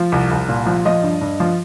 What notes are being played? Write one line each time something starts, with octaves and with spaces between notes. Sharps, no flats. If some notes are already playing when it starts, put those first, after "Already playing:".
Already playing: F3
C2
C2
A#2
F3
F3 D#5
G2
G2
F3